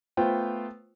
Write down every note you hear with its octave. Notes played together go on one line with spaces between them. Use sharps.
A3 B3 F4 C5 G5